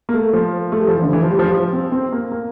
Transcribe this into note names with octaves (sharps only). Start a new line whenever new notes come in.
A#3
A3
F3
A3
G3
F3
E3
D3
E3
F3
G3
F3
G3
F3
C4
C4
A#3
A#3